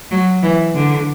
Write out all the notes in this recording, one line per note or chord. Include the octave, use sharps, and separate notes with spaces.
F#3
E3
D3